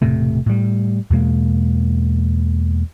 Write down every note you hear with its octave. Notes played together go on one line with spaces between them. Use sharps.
E1 A2 C3 A3
A2 G3
E2 B2 G#3 A#3